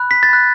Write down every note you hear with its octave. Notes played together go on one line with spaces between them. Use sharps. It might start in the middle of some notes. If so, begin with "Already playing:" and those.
Already playing: B5 F#6
B6
A6
B5 F#6